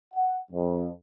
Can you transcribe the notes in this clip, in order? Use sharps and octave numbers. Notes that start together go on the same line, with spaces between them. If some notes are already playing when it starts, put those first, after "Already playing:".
F#5
F2